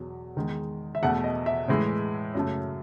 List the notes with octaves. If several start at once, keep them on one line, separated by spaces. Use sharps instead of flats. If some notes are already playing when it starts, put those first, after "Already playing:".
Already playing: E2 B2 F#3
E2 D#3 G#3
E5
E2 B2 A3 F#5
D#5
E5
A2 E3 G#3
F#2 C#3 F#3 A3